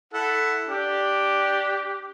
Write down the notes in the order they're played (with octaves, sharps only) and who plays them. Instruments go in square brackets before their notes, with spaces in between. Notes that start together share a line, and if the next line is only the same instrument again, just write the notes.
[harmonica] E4 A4 F#5
[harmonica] D4 [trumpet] G4